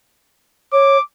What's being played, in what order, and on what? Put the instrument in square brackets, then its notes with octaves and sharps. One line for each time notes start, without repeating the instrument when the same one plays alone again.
[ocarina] C#5 [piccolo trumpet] D6